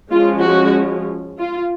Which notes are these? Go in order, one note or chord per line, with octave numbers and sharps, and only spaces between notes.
F3 G#3 C#4 F4
F#4
F4